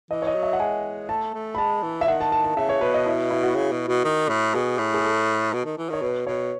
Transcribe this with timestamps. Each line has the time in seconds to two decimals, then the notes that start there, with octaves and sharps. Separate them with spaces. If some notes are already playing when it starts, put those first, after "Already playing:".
0.11 E3 D#5
0.22 C#5
0.27 D#5
0.35 F#3
0.43 E5
0.53 F#5
0.60 G#3 G#5
1.09 A3 A5
1.34 A3
1.55 B5
1.58 G#3 A5
1.83 E3
2.01 E5
2.07 D#3 F#5
2.21 A5
2.32 A5
2.44 A5
2.57 C#3 E5
2.69 C#5
2.81 B2 B4
2.94 D#5
3.06 E4
3.31 E4
3.43 F#4
3.55 C#3
3.72 B2
3.88 B2
4.04 D#3
4.29 A2
4.54 B2 G#4
4.78 A2
4.94 G#4
5.03 A4
5.53 B2
5.65 D#3
5.78 E3
5.90 D#3 C#5
6.02 B2 B4
6.27 B2 C#5